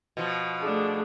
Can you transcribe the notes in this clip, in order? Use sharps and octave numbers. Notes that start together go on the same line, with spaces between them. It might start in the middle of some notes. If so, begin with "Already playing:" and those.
B2 F3
A3 D4 G#4